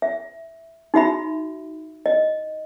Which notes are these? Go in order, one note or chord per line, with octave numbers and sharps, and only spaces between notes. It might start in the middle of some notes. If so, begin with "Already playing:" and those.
E5
D#4 F#4 E5 B5
D#5